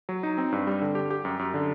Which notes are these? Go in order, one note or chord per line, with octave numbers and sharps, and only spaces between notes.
F#3
D#4
C4
G2
G3
D3
G4
G4
F#2
F#2
D3